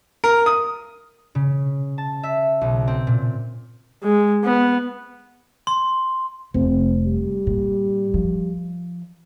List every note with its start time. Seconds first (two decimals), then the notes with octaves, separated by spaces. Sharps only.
0.24 A#4
0.46 D#6
1.35 C#3
1.98 A5
2.23 E5
2.61 B1
2.88 C4
3.07 A#2
4.03 G#3
4.44 B3
5.67 C6
6.54 F1 C4
7.06 G3
7.47 A#2
8.14 F3